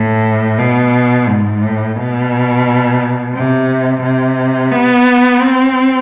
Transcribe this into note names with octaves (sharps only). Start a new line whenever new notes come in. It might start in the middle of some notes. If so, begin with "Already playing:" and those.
Already playing: A2
B2
G#2
A2
B2
C3
C3
B3
C4